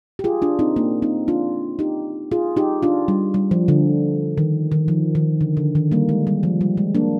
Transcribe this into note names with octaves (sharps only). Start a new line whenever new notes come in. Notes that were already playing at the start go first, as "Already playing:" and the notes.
G4
F4 G#4
D4 F4
C4 D#4
A#3 D4
C4 D#4
D4 F4
D#4 G4
F4 G#4
D#4 G4
D4 F4
G3
G3
F3
D3
D#3
D#3
F3
D#3
D3
D3
D#3
G3 A#3
G#3
G3
F3
G3
G#3
A#3 D4